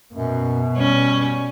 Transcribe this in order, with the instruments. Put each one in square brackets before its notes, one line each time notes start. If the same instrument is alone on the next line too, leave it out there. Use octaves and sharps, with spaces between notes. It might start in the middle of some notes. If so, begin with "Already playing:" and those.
[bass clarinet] F#2 [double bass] B2
[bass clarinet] G3 [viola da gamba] C#4